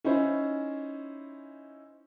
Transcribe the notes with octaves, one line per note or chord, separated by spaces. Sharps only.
C#4 D#4 E4 C5